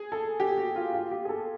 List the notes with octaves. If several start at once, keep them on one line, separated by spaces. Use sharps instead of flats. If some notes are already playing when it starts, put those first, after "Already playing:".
Already playing: G#4
A4
G4
F#4
F4
F4
G4
G#4
A4